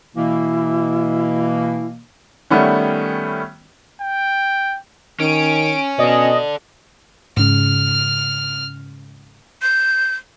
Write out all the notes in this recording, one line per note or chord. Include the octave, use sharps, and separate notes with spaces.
B2 E3 A#3 E4
D#3 G3 A3 B3 C#4
G5
D#3 C#4 D7
B2 A4 D5 D#5
G#2 C#3 F6
G6